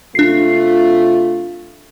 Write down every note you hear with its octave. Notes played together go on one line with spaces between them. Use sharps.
C3 A3 D4 F4 C7